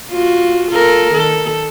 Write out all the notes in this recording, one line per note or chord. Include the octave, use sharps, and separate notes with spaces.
F4 F#4
F4 A4 A#4
D#3 A4